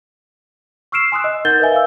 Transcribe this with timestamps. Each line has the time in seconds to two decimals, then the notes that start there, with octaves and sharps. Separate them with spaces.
0.92 C#6 E6 F6 C7 D7 E7
1.12 G#5 C6 D#6 E6 F#6
1.24 D#5
1.45 D#4 A#4 F#5 G6 A6 G7
1.60 A#4 B4 D#5 E5 G#5
1.72 F5 G#5 E6